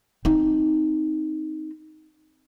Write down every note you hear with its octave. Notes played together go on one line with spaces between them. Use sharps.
C4 D#4